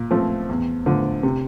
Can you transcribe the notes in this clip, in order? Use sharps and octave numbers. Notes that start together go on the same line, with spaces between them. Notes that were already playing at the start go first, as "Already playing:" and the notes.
Already playing: A#2
F3 A3 C4
E2
D3 F3 A3
C3